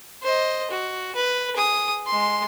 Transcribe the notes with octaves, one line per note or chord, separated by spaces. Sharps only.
C5 D#5
F#4
B4
G#4 D#6
G#3 C6